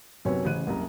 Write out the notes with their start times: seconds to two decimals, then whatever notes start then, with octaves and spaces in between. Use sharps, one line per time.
0.25 B1 F#2 C3 B4 C#5 G#5
0.45 A1 C#3 C5 F#6 D#7
0.67 F#1 C2 A#5